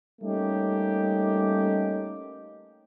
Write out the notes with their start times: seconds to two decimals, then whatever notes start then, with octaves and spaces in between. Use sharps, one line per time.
0.21 G3 A3 A#3 C#4 D#4 G4